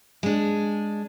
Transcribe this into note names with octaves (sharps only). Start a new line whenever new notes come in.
G#3 D4